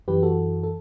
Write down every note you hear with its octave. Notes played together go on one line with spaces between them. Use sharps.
F#2 E3 G4 B4
F#4 A4
A4